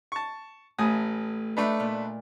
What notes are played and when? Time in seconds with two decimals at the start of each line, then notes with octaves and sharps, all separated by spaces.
0.12 A5 C#6
0.79 A1 A3 B4 G#5 D#6
1.57 A3 D4 D#4 B4
1.80 A#2